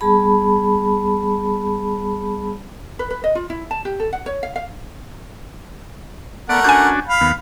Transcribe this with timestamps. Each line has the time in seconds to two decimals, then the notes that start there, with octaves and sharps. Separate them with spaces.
0.01 G3 B3 G#4 A5 B5
2.99 B4
3.10 B4
3.24 D#5
3.35 F4
3.50 E4
3.71 A5
3.85 G4
4.00 A4
4.13 F#5
4.26 C#5
4.43 F5
4.56 F5
6.49 A3 B3 A#4 D5 F#5
6.64 C#4 D4 F#4 G#5 G6
7.08 F5 B5
7.21 D#2 B3